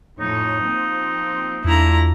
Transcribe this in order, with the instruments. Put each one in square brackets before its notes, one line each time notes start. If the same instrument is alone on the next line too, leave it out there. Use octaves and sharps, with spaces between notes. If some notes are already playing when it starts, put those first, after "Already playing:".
[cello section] F2 A2 C#5 [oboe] D#4
[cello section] F3 A#3 C4
[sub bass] E2 [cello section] A3 D4 F4 [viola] E4 A#5